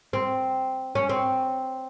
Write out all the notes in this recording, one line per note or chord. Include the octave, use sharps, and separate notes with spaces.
C4
C#4
C4